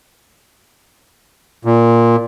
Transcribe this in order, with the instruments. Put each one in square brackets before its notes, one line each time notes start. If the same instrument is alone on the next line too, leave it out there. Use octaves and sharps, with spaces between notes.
[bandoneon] A#2